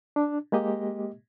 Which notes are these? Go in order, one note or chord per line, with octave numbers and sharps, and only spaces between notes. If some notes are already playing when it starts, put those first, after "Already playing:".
D4
G#3 A#3 G4 D#5